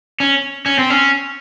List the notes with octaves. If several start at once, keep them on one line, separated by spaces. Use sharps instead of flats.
C#4
C#4
C4
C#4